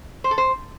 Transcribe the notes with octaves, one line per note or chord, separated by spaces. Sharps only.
C5
A4
C5